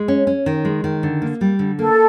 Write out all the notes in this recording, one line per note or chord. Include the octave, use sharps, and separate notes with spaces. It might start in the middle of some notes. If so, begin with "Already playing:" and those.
Already playing: G#3
C#4
C#4
D#3
G#3
D#3
D3
A#3
G3
D3
A#3 A4